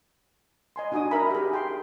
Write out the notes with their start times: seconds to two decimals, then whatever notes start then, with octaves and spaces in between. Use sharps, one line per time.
0.76 D#5 G#5 C6
0.92 D4 D#4 F#4 G#5 D#6
1.11 D#4 A#4 E5 A#5 B5
1.31 G4 G#4
1.53 G5 C6